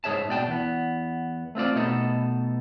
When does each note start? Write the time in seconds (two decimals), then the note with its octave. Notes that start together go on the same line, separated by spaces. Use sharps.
0.04 G#2 G#4 C#5 E5 A5
0.29 B2 D5 G5 A5
0.47 E2 B3
1.55 A3 C4 F4 D5
1.75 B2 A3 B3 D#4 A4